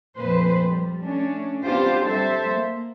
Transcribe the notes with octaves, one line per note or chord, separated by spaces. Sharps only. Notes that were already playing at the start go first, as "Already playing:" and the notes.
F2 A#2 B4 C5
G3
A3 C#4 D4
B3 C4 D4 F4 G4 C5
G3 A4 C5 E5
A#3